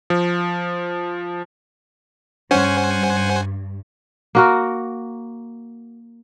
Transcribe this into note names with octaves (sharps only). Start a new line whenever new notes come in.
F3
G2 C#4 C5 F#5 G#5
A#3 F#4 A#4